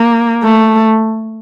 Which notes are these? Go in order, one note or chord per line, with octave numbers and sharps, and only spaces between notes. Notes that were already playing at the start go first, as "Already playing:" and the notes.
Already playing: A#3
A3